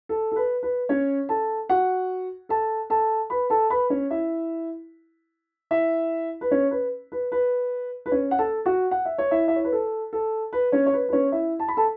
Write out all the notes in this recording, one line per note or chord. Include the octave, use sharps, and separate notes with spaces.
A4
A4
B4
B4
C#4 C#5
A4 A5
F#4 F#5
A4 A5
A4 A5
B4 B5
A4 A5
B4 B5
C#4 C#5
E4 E5
E4 E5
B4
C#4 C#5
B4
B4
B4
B4
C#4 C#5
F#5
A4 A5
F#4 F#5
F#5
E5
C#5
E4 E5
E5
C#5
B4
A4
A4
B4
C#4 C#5
C#5
B4
B4
C#4 C#5
E4 E5
A5
B5
A4 A5